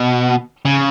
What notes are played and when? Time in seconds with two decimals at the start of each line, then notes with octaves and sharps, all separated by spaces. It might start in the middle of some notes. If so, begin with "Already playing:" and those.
Already playing: B2
0.65 C#3